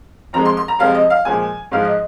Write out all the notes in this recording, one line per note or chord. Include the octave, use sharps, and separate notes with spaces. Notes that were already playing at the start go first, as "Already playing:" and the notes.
F2 F3 G#3 A#5
C6
C6
A#5
F2 C3 F3 G#3 F5
D#5
F5
A#2 F3 G#3 G#5
G#2 F3 G#3 F5
D#5